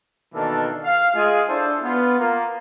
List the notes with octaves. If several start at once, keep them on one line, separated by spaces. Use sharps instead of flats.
B2 D#3 E3 A#3 D4 A4
F5
G#3 F4 G#4
D4 E4 A4 C5
B3 F4
A#3 F4